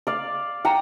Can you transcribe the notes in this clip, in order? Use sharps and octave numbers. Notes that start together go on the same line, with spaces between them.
D5 F5
F#5 G5 A#5